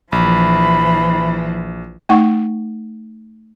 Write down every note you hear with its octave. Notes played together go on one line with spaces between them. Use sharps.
A#1 E3 F3 B5
A3 D#4 F#5 C#6